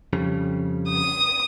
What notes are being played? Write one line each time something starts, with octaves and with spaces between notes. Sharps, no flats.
F2 C#3 G3
D#6